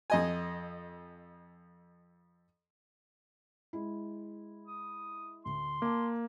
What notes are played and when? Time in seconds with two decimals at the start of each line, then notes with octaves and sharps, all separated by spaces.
0.10 F2 D#5 G#5
3.73 G#3 E4
4.68 D#6
5.45 D2 C6
5.82 A#3 A5 D6